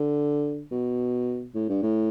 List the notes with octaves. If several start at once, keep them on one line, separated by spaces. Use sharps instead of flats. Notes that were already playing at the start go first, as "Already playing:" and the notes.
Already playing: D3
B2
A2
G2
A2